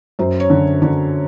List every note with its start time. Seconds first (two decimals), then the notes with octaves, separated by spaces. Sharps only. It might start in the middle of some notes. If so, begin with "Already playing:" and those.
0.19 F#2 C5
0.40 C#5
0.50 D3
0.82 D3